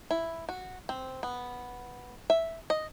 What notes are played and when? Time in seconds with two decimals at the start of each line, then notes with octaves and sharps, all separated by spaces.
0.11 E4
0.49 F#4
0.89 C4
1.23 B3
2.30 E5
2.70 D#5